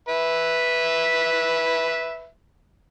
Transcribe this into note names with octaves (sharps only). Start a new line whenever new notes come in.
B4 E5